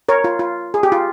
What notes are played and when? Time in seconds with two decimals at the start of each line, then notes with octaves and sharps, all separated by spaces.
0.09 A#4 C#5
0.24 F4
0.39 F4
0.74 G#4
0.83 G4
0.92 F4